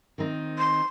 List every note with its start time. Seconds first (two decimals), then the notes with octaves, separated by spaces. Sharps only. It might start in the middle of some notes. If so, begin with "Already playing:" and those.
0.18 D#3 C4 D#4
0.58 C6